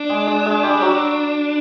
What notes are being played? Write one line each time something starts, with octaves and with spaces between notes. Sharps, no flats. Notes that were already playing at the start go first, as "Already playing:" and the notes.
Already playing: D4
G#3 G#4
G#3 G#4
G#3 G#4
G3 G4
F#3 F#4